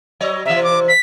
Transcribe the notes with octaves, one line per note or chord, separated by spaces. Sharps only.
F#3 C#5 D#5
C3 E3 E5
D6
B6